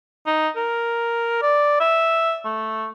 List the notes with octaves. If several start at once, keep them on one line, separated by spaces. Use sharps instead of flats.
D#4
A#4
D5
E5
A3